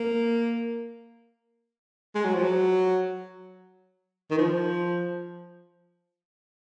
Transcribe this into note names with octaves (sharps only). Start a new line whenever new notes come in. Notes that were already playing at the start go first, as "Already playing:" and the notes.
Already playing: A#3
G#3
F#3
F3
F#3
D#3
F3